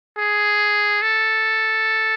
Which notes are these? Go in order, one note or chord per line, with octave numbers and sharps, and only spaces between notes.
G#4
A4